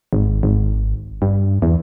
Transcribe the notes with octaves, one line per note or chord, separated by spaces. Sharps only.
G#1
G#1
G2
E2